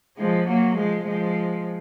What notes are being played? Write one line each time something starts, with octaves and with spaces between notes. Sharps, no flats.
F3 G#3
F#3 A#3
F3 G#3
F3 G#3